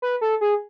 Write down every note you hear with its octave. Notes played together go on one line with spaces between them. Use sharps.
B4
A4
G#4